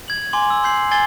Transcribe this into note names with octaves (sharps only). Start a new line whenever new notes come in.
G#6 F#7
G#5 C6 D6 F#7
E6
C6 G6 C7 F#7
G#5 G#6 A6 C7 G7